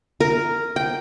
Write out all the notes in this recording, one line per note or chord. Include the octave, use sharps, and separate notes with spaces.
A#4
G5